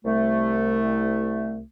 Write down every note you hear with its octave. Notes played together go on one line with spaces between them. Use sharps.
C2 A3